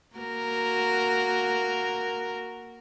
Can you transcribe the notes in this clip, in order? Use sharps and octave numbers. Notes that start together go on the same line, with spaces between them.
A#3 F#4 A#4